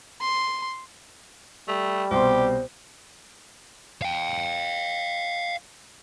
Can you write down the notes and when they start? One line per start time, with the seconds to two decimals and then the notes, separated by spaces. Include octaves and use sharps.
0.21 C6
1.68 G3 A3
2.11 C2 B2 G4 C5 C6
4.02 F5 G5